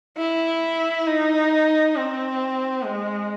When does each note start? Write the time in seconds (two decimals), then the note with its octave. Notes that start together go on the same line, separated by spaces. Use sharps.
0.18 E4
1.07 D#4
1.96 C4
2.85 G#3